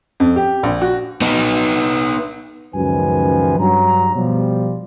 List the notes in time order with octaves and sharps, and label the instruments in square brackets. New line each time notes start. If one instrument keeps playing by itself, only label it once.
[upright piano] F2
G4
A#1
F#4
[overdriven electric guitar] B3 D#4
[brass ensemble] C#2 F#2 D#3 F3 B4 G#5
G2 F#3 A#5
B2 F3 G3